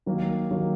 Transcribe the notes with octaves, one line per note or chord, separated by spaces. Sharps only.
D#3 F#3 A#3
D#3 F#3 A#3